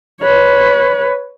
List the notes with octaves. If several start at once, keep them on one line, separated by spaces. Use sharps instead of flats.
B4 C#5